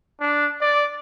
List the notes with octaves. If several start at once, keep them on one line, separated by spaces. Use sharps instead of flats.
D4
D5